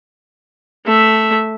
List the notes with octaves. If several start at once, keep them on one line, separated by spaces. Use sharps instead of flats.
A3 E5